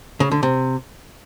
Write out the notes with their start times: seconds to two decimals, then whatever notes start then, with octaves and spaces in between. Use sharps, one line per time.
0.20 C#3
0.31 D3
0.43 C3